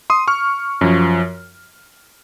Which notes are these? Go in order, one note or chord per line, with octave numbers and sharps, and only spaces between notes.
C6 D#6
C#6 F6
F#2 F3